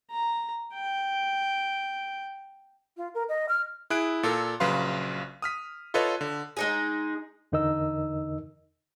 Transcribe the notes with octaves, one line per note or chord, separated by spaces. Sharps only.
A#5
G5
F4
A#4
D#5
F6
E4 G#4 F#6 D7
A#2 A4 A#4
A#1 C#3 F#3 B4 F5 C6
D#6 F6 B6
F4 A4 B4 C#5 D#5
D3
G#3 D#4 G#4
E2 D3 D#4 A#4 D#5 E6